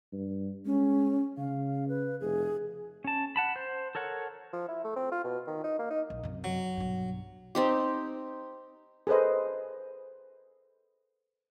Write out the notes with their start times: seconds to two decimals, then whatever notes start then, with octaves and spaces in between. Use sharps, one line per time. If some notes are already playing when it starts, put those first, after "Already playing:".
0.12 G2
0.66 G#3 C#4
1.38 C#3 F5
1.88 B4
2.20 F1 G#4
3.04 C#4 A5
3.36 F#5 A5 B5
3.56 C5
3.95 A4 A#4 C#5 F#5
4.53 F3
4.68 E4
4.84 A3
4.96 C4
5.12 F4
5.24 B2
5.47 D#3
5.64 D#4
5.79 A#3
5.91 D#4
6.10 A#1
6.24 F#2 C3
6.44 F#3
6.77 B1 G2
7.55 C4 D#4 G4
9.07 G#4 A4 B4 C5 D#5